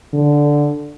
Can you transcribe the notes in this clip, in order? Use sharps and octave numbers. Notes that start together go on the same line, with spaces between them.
D3